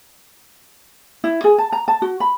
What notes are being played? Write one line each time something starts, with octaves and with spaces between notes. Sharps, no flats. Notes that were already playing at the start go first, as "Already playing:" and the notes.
E4
G#4
A5
A#5
A5
F#4
B5